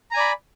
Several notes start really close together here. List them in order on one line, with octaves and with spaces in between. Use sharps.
A#5 G#5 D5 B5